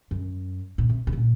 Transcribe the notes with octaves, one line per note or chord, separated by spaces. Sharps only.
F#2
A#2
C3
C3
A#2